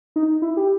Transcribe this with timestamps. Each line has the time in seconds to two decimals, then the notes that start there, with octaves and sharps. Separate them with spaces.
0.16 D#4
0.42 E4
0.57 G4